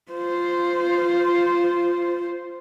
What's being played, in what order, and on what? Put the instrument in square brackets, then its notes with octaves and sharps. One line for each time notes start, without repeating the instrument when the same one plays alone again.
[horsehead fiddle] F4 C5